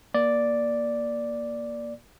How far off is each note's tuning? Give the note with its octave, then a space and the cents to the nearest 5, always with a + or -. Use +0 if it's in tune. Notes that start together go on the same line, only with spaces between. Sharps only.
A#3 +15 D5 +0